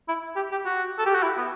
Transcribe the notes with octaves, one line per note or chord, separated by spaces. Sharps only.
E4
G4
G4
F#4
A4
G4
F#4
E4
B3